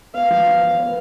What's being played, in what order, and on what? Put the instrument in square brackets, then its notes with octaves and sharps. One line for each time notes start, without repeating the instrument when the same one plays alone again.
[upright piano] B3 [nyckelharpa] F5
[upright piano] F3
B3
B3
B3